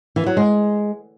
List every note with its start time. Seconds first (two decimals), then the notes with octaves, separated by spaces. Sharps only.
0.16 E3
0.26 F#3
0.37 G#3